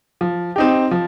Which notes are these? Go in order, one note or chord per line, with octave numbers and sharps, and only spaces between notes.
F3
C4 D#4 G4
F3